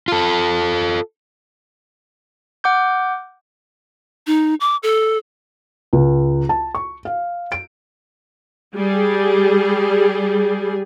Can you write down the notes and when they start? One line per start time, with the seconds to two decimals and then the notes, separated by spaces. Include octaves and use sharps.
0.08 F4 A4
2.64 F#5 D6 G6
4.27 D#4
4.60 D6
4.83 A4
5.93 C#2
6.49 A5
6.75 C#6
7.05 F5
7.52 D7
8.76 G3 G#4